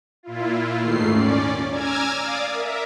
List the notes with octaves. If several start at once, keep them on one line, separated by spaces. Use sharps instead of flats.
A#2 E4 F4
D#2 G#2 D#3 A3 C7
C#4 D5
G#5 A#5 D6 E6 F6 G#6
D5 F5 D6 D#6
A#4 E5